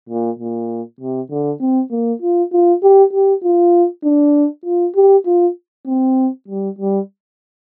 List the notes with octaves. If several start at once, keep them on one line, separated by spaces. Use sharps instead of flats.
A#2
A#2
C3
D3
C4
A#3
F4
F4
G4
G4
F4
D4
F4
G4
F4
C4
G3
G3